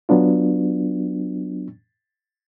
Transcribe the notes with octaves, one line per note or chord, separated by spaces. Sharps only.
F#3 B3 D4 F4